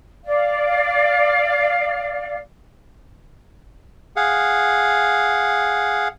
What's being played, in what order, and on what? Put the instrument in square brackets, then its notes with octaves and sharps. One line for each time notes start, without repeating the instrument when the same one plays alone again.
[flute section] D5 F5
[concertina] G#4 F5 F#5